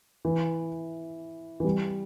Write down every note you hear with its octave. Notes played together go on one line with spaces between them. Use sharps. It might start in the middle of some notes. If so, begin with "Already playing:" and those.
E3
E3
G3